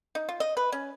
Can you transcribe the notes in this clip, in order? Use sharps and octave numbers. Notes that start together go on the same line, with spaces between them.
D#4
F4
D#5
B4
C#4